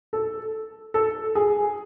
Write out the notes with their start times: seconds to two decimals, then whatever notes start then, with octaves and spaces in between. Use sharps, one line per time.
0.13 A4
0.94 A4
1.35 G#4